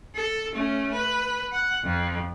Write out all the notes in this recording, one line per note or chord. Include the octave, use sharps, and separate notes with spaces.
A4
A3 C#4
B4
F#5
F2